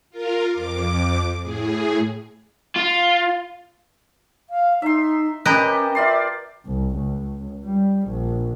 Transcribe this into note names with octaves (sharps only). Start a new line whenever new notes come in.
F4 A#4
F2 D6
A2 G#4
F4
F5
D#4 E5 C6
C#4 G4 A#4 B4 D#5 A5
F4 D5 E5 C6
C2
C#2
G3
A#1